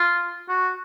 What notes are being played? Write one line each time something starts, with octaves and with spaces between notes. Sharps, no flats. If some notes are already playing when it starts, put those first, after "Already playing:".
Already playing: F4
F#4